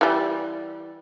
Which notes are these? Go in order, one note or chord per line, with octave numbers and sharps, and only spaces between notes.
E3 G3